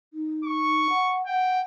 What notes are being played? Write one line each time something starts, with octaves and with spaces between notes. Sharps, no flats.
D#4
C#6
F#5
F#5 G5